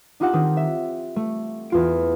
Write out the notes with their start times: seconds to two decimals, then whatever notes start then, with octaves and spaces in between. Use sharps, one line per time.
0.20 D4 D#4 F4 G4 F#5 A5
0.33 D#3 C4 D#4
0.57 E5
1.16 A3
1.70 E2 F4 D7